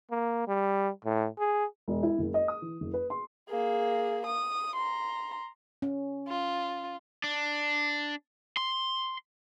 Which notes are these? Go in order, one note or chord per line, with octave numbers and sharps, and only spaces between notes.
A#3
G3
A2
G#4
E1
E4
F#1
D#5
D#6
E3
F#1
B4
C6
A#3 G#4
D#6
A#5 C6
C#4
F4
D4
C6